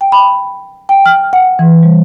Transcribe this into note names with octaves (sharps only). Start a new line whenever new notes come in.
G5
B5
G5
F6
F#5
E3
G3